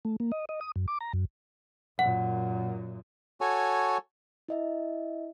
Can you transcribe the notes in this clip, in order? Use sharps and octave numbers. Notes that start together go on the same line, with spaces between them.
A3
A#3
D#5
D#5
D#6
F#2
D6
A#5
F#2
F#2 A#2 F#5
F#4 A4 C#5 G#5
E4 D#5 E5